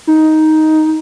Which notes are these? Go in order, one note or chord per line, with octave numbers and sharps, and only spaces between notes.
D#4